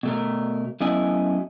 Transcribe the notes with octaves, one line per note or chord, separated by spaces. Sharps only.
B2 A3 A#4
F#2 A3 B3 E4 D#5 G#5